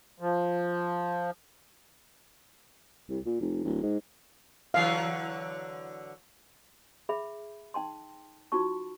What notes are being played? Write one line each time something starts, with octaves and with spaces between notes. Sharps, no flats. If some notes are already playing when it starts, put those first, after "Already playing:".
F3
C2
A#2
F1
D1
G#2
D3 E3 F#3 F5
G#4 E5 B5
D#4 G5 A5 C6
D#4 F4 F#4 A5 C#6